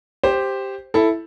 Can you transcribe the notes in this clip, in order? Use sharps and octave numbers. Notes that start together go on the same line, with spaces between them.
G4 C5
E4 A4